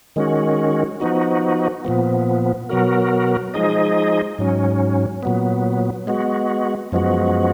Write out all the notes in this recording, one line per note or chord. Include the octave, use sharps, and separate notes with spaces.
D#3 G#3 C#4 F#4
F3 B3 D#4 F#4
A#2 F3 B3
B2 F#3 B3 F#4 A#4
F3 G#3 D#4 G#4 D#5
G#2 F#3 C#4
A#2 F#3 B3
G#3 B3 F#4
F#2 F3 G#3 B3 F#4